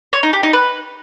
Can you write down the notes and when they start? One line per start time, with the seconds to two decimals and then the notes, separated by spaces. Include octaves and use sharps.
0.13 C#5
0.23 D#4
0.33 G4
0.43 D#4
0.53 B4